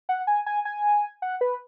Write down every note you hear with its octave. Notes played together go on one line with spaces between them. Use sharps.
F#5
G#5
G#5
G#5
F#5
B4